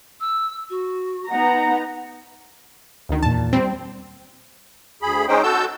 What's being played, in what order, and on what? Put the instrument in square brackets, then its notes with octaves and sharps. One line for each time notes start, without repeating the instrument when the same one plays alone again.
[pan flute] E6
F#4
[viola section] B3 D#4 A#5 [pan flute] F#5
[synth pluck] D2 D#3
[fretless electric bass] E2 A#2 [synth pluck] A5
[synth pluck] G3 C4
[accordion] D2 G#4 B5
G#3 C#4 D#4 C5 G5
F#4 A4 A5 E6 G6